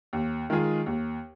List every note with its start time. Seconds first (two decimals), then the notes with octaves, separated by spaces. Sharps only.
0.13 D#2
0.50 D#3 G#3 F4 G#4
0.86 D#2